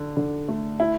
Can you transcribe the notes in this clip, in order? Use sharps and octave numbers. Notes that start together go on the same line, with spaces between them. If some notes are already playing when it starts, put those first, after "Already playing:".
Already playing: D3 D4
D3
A3
E4